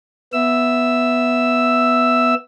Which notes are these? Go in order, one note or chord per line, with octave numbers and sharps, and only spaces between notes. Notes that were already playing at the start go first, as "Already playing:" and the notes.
B3 E5 E6